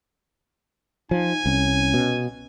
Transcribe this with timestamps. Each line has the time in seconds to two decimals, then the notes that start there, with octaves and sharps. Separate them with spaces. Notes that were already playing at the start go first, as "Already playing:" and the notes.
1.11 F3 D#4 G#5
1.46 C2 C#4
1.94 B2